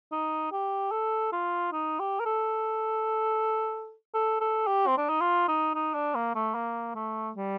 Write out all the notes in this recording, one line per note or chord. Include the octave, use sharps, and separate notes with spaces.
D#4
G4
A4
F4
D#4
G4
A#4
A4
A4
A4
G4
C4
D4
D#4
F4
D#4
D#4
D4
A#3
A3
A#3
A3
G3